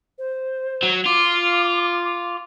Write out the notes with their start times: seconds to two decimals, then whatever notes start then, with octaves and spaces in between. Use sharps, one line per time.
0.18 C5
0.83 F#3
1.06 F4 D6
2.05 D6